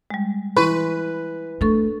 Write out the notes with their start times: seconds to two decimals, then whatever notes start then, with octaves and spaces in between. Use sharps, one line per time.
0.10 G3 G#3
0.57 E3 B4 C6 C#6
1.61 A3 D4 A4 C#6